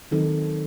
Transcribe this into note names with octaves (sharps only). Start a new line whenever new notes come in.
D#3 F#3 C4 D#4 A4